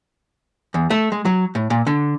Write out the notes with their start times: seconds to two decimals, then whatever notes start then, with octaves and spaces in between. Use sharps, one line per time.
0.74 E2
0.90 A3
1.12 G#3
1.25 F#3
1.55 A2
1.70 A#2
1.87 D3